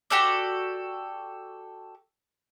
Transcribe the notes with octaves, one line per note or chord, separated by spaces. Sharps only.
F#4 G4 A4 D5